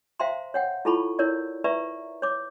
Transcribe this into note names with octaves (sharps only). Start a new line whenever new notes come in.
C5 E5 F5 G5 A#5 C6
C#5 F#5 G5
E4 F4 A4 A5 B5 C#6
E4 A#4 C#5 D5
B4 D5 E5 A#5 C#6
C#5 D6